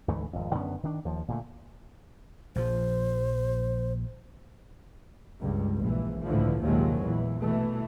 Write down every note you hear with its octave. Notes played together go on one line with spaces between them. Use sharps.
D2 G#2 E3 A3
G#1 F2
F#2 D3 B3 C#4
D#3 D4
D#2 F3
A#2 D3 A3
A#1 F3 C5
C#2 G2
A#1 E3
C#2 A2 D3 E3 F3
A#1 D#2 C3 F3 F#3 G#3
A#1 E2 A#2 E3
B2 E3 A3